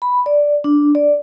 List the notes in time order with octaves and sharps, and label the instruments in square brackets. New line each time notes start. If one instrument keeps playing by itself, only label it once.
[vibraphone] B5
D5
D4
D5